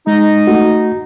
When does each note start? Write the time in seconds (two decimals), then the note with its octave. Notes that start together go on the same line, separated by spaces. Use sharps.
0.07 G#3 D#4
0.47 A3 F#4